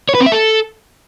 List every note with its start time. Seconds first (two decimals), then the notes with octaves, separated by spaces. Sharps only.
0.09 C#5
0.15 B4
0.20 C4
0.26 E5
0.32 A4